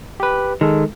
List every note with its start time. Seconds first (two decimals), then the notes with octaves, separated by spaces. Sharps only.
0.20 G4 B4
0.61 D#3 G#3 A4